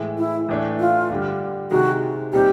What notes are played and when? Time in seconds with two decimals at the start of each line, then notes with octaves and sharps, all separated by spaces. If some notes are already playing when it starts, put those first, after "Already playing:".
Already playing: A2 E3 G#3
0.18 E4
0.48 A2 E3 A3 D4
0.80 F4
1.10 G2 D3 G3
1.71 C3 D#3 G#3 F#4
2.33 A#2 G3 C4 D#4 G4